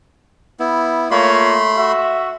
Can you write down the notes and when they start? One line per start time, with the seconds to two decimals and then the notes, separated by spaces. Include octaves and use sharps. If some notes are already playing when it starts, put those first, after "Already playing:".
0.60 B3 E4
1.11 A3 A#3 F4 C#5 B5 C6
1.77 F#4 E5